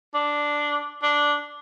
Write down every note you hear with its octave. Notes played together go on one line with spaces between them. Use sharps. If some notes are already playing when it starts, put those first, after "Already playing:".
D4
D4